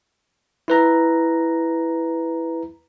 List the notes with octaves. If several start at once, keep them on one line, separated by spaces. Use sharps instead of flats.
E4 B4 A#5